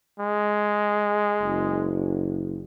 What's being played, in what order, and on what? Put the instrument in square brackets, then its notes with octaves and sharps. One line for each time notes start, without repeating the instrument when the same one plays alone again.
[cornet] G#3
[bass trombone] F#1